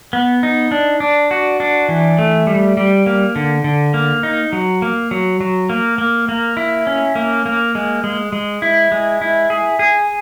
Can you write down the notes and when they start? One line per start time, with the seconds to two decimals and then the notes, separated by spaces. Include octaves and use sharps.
0.13 B3
0.43 D#4
0.71 D4
1.00 D4
1.31 F#4
1.60 D4
1.89 E3
2.19 A3
2.47 G3
2.77 G3
3.06 A#3
3.36 D3
3.64 D3
3.94 A#3
4.23 D#4
4.53 F#3
4.82 A#3
5.11 F#3
5.41 F#3
5.69 A#3
5.98 A#3
6.29 A#3
6.57 E4
6.87 C#4
7.15 A#3
7.46 A#3
7.75 G#3
8.04 G#3
8.33 G#3
8.62 E4
8.92 G#3
9.21 E4
9.50 G#4
9.79 G#4